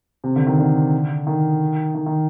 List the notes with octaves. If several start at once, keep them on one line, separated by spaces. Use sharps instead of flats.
C3
D3
D#3
D3
D#3
D#3
D#3